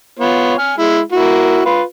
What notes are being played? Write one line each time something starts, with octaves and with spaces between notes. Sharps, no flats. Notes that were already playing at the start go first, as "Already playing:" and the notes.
B3 F4 C#5
G#5 F6
G#3 E4
A#3 E4 F#4
F4 B4